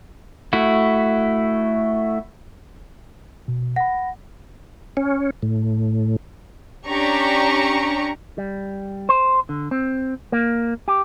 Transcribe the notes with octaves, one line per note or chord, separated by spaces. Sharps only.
A3 E4 F#4
B2
F#5 B5 A#6
C#4
A2
C#4 D4 G4 A#5 C#6
G3
C5
D3
C4
A#3
G4